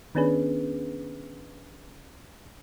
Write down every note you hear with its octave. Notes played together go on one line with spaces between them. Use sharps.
D#3 B3 C#4 D4 G#4 B4